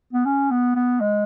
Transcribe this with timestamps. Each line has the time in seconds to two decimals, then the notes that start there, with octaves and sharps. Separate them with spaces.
0.13 B3
0.25 C#4
0.51 B3
0.75 B3
1.01 G#3